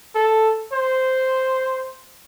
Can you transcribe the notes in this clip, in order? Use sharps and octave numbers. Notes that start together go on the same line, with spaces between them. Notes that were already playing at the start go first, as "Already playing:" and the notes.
A4
C5